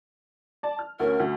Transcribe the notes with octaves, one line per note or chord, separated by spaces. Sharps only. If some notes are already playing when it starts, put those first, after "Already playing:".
D5 A5
F6
D2 C#4 A#4
D2